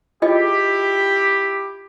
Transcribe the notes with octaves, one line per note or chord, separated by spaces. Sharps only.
E4 F4 G4 G#4 D#5